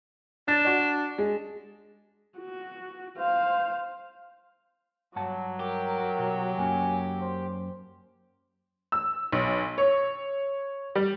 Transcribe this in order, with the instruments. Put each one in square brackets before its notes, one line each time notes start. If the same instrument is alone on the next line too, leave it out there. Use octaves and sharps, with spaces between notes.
[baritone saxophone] D4 [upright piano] A6
[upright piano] F#4 D5
G#3
[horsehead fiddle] F#4
C5 F5
[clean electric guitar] G2 F#5 A5 [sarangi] F#3
[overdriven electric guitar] G4 [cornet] A#4
[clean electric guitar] B1
[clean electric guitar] F#2 A#3 C#4 [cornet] G#5
[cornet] C5
[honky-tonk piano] E6
B1
C#5
G3